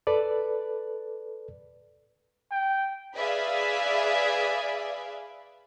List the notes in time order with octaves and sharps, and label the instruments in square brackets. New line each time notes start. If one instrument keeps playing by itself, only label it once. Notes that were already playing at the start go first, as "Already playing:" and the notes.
[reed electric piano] A4 B4 D5
[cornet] G5
[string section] G#4 B4 D5 E5 F5 B5